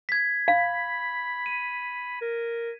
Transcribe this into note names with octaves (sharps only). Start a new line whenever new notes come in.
G#6 B6
F5 B5
D#7
A#4